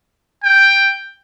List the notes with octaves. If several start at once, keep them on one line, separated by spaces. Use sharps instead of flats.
G5